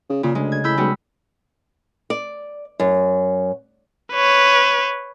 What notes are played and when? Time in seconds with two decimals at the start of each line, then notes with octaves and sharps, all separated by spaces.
0.09 C#3
0.23 A#2 C#3
0.35 D2 G#3
0.52 G#6
0.64 A2 B5 E6 G6
0.77 B1 G3 G#3 F#4
2.10 D5
2.80 F#2
4.13 B4 C#5